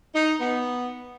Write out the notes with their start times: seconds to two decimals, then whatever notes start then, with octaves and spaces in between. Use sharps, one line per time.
0.15 D#4
0.40 B3